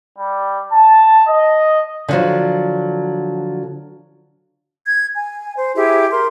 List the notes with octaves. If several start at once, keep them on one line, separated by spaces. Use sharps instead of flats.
G3
A5
D#5
D3 F3 F#3
G#6
G#5
C5
E4 G4 G#4 E5
A#4 C6